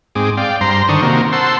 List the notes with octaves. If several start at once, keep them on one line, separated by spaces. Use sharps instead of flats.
G#2 C4 G#4 D6
D5 F5 G5
G2 C5 A#5 C6
D3 D#3 D4 C5 C#6 D#6
C3 D#3 A#3 F#4 A#4 C5
C5 F#5 A5 C6 E6